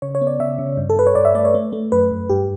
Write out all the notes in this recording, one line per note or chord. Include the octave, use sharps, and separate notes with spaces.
C#3 C#5
C#5
B3
D5
C#3 E5
C#3
G2
A4
G2 B4
C#5
G2 D5
E5
A3 D5
C#5
A3
A3
F#2 B4
F#2
G2 G4